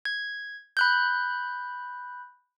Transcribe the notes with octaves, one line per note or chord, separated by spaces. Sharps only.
G#6
B5 F#6 G6